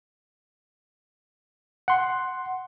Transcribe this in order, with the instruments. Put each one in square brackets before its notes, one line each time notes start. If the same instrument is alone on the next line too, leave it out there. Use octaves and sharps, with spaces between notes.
[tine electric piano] F#5 C6